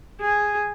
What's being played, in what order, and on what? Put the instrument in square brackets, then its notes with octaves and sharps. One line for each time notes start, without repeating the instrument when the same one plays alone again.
[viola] G#4